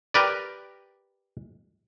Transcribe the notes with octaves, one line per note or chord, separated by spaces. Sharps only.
G4 A#4 B4 D5